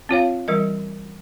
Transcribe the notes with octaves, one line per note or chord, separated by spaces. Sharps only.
C4 F4 C#5 F5
E3 G3 A#4 D#5